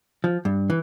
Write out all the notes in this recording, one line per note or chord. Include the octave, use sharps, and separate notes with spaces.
F3
G2
E3